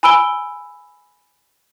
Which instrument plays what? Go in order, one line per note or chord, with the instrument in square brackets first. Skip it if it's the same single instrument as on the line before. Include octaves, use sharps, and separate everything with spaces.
[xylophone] G#5 B5 E6 D7 G7